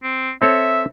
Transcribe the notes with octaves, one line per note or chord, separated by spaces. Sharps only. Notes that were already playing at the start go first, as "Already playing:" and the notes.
C4
C4 A4 C#5 E5